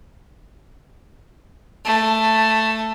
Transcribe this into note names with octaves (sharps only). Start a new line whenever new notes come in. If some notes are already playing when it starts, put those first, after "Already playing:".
A3